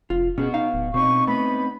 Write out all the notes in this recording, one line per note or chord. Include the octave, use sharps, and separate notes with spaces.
F1 F4
B2 B3 C#4 F#4 G#4
D#4 F5
D1
B2 C4 C#4 D#4 C#6
A3 B3 B5